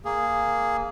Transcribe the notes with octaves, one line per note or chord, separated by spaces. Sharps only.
A#3 G#4